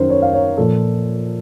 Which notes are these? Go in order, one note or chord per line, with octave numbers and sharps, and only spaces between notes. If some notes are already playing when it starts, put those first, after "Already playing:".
Already playing: F#2 D#3 F#3 A#4 C5
C#5
F5
C#5
A#2 F3 A4